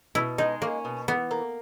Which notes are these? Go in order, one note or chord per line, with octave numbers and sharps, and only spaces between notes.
B2 E4
G#3 D#4
A#3 C#4
B2
E3 B3
A#3